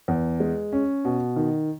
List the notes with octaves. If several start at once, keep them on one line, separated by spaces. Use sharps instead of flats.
E2
G#3
C#4
B2
D#3